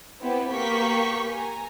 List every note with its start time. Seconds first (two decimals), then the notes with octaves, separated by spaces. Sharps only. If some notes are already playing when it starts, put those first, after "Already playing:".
0.20 B3 C4 E4 G4 C5
0.48 A#3 B3 G4 C#6 G6 B6
1.28 G#5 A#5